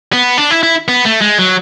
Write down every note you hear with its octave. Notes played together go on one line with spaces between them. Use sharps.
B3
D4
E4
E4
B3
A3
G#3
F#3